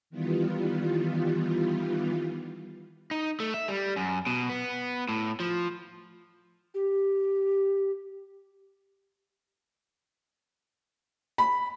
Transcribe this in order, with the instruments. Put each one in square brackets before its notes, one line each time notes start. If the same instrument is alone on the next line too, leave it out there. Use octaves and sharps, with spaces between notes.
[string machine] D#3 E3 G3 B3 F4
[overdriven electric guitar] D#4
A3
E5
G3
F#2
B2
B3
A2
F3
[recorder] G4
[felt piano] B5